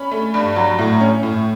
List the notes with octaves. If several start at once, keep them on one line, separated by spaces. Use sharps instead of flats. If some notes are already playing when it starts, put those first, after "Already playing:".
Already playing: C#4 B5
A3
G2
F#3
A2
C#4
A2